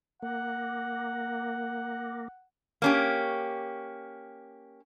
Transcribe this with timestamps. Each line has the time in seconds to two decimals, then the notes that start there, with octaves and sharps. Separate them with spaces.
0.22 A#3 F#5
2.82 A#3 C#4 G4